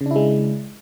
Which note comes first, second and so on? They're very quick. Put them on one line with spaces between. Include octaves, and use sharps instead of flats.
C#3 D4 E4 G#3